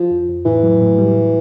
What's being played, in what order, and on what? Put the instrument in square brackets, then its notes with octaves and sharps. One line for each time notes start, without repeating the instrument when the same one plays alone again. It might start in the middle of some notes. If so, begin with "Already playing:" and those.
Already playing: [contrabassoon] F3
[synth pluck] F2
F2
[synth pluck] A2 [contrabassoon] E3
[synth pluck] F#3
A2
G3